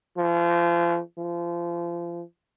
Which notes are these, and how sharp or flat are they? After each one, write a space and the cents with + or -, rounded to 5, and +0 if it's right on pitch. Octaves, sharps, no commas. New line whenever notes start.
F3 -35
F3 -30